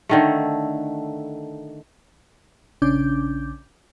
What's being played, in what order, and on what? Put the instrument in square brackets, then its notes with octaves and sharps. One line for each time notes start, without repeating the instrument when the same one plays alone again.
[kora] D3 D#3 A3
[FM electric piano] A#1 C#3 C#4 D4 D6 G6